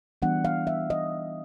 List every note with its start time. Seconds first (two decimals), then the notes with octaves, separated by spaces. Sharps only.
0.22 E3 G3 B3 D4 F#5
0.45 F5
0.67 E5
0.90 D#5